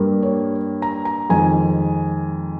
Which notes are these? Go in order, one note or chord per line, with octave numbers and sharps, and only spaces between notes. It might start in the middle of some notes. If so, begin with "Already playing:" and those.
Already playing: G2 G3 A#3
C#5
A#5
A#5
F2 D#3 G#3 G#5